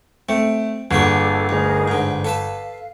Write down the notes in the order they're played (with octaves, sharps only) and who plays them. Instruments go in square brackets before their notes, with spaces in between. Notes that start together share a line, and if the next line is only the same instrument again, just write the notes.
[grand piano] A3 [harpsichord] C4
[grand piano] G1 [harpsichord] D3 A#3 F#4 [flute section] G#4 A4 D6
[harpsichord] D2 [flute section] D#4 G#4 A#4
[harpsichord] G#2 D3
[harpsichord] A4 B4 A5 [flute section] F5